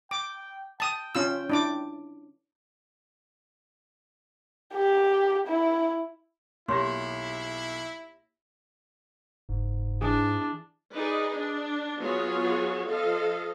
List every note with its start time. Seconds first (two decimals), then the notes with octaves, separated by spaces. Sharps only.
0.11 G5 D6
0.80 G5 A5 D#6
1.15 C#4 F4 E6
1.50 D4 E4 D6
4.74 G4
5.47 E4
6.69 B1 A#3 E4 G4 C#5 C6 A#6
9.49 F#1 G#2
10.01 E3 D4 G#4
10.93 D#4 G#4 B4 D5 D#5
11.36 D4
12.00 F#3 B3 F4 F#4 G#4 C#5
12.85 F3 A4 D#5 F5